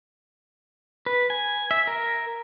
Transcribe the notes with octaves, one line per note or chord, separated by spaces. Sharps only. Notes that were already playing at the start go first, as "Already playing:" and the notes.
B4
G#5
E5
A#4